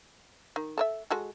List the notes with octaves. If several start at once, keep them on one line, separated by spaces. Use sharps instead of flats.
D#3
A4 A#4 E5
G#3 F#4 A4